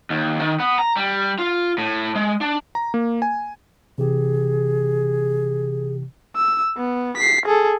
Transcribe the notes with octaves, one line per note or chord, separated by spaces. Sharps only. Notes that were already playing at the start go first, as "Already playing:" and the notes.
D#2
D#3
B3
A#5
G3
F4
A2
G#3
D4
A#5
A#3
G#5
C3 E3 G4 G#4
E6
B3
B6 C7
G#4 A4